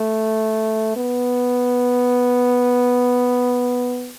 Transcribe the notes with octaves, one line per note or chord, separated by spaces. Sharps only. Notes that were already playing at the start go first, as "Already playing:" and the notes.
Already playing: A3
B3